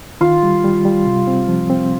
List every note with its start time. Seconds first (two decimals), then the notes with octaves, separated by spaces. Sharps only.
0.21 D#3 F4
0.43 G3
0.64 G3
0.85 G3
1.06 C3
1.27 C4
1.48 F3
1.70 C4